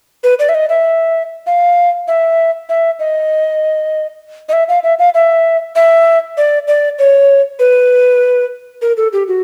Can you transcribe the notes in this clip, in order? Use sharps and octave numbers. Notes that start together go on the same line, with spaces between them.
B4
D5
E5
D#5
E5
F5
E5
E5
D#5
D#5
E5
F5
E5
F5
E5
E5
D5
D5
C#5
B4
A#4
A4
G4
F#4